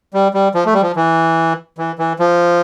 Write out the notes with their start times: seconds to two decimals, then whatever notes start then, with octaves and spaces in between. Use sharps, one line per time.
0.14 G3
0.34 G3
0.54 F3
0.66 A3
0.74 G3
0.82 F3
0.96 E3
1.78 E3
1.99 E3
2.19 F3